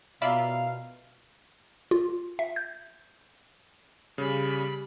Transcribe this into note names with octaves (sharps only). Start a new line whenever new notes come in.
B2 E4 F4 A#4 D5 E5 F5 B5
F4
E5
G6
C#3 G3 B5